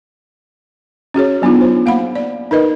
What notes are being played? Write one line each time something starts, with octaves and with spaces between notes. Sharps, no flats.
C#4 F#4 G#4 C#5
F#3 B3 D4 D#4 F4
C5
A#3 F5 F#5 B5
D5
D#4 A#4 B4 D#5